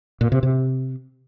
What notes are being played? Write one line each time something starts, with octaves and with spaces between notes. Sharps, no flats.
A#2
C3
C3